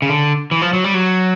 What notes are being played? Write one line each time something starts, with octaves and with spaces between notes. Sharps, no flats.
C#3
D3
E3
F3
F#3
G3
F#3